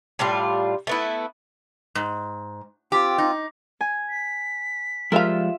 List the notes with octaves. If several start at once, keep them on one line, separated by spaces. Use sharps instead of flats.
A2 G3 D4 F4
A3 B3 E4
G#2
C4 F4 G4
D#4
G#5
B6
F3 G3 G#3 F4 A#4 E5 F5